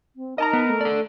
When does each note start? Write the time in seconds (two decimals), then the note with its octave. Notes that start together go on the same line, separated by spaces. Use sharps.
0.16 C4
0.38 D#4 A#4 D#5 A5 A#5
0.53 B3
0.68 A3
0.81 A4 D5